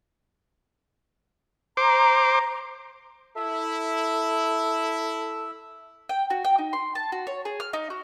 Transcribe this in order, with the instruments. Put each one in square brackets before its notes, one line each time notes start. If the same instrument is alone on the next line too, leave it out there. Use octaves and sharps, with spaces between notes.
[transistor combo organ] C5 D6 [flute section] A#5
[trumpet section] E4 [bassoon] A4 [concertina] E5
[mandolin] G5
F#4
G5
D#4
C6
A5
F#4
C#5
G#4
F6
D#4
F#4